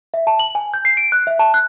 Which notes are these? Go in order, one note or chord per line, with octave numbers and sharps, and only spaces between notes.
E5
A5
F#7
G#5
G6
C7
D7
F#6
E5
A5
F#6